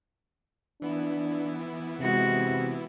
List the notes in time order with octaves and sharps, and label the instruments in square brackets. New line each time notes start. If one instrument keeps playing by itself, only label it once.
[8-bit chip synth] E3 B3 E4 [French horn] D4
[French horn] C3 [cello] G#3 F#4